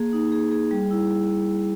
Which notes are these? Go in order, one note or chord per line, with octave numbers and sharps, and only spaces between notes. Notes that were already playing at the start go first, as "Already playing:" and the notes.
Already playing: A#3 G#4
D#4
G#4
G#4
G3
E4